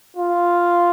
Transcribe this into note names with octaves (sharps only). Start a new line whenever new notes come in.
F4